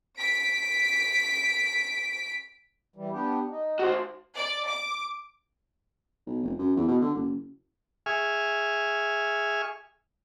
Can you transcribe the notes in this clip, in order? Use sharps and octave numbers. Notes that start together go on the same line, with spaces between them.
B6 D7
E3 G3
B3 D4 G4
D#4
F#4 C5
D5
D6
B1
F1
F#2
E2
B2
D3
F#1
G#4 E5 G#5 C#6 F6